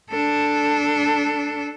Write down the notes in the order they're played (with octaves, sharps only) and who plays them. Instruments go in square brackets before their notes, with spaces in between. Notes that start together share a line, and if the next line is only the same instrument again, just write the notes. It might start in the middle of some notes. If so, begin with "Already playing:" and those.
[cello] D4 A4